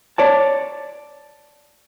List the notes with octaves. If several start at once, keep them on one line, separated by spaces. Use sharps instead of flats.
C#5 D5 A5